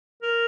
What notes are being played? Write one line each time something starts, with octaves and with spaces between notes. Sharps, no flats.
A#4